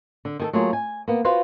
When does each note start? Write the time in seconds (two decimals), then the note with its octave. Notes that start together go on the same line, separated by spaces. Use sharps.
0.25 D3
0.39 D#3 G#4 A4
0.53 F#3 A3 A#3 F4 G#4
0.73 G#5
1.08 A#3 B3
1.25 F4 F#4 B4 C5 F5